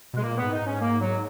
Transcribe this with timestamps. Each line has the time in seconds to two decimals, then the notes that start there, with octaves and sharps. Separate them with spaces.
0.13 B2 G#3
0.23 A#2 A#3
0.38 G#2 B3
0.52 D#4
0.62 G#2 C#4
0.81 A#3
1.00 F#3